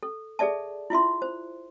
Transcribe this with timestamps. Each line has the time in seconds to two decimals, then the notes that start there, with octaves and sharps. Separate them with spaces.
0.03 A4
0.39 G#4 A4 D5 E5 A5
0.90 E4 F4 E5 C6
1.22 C5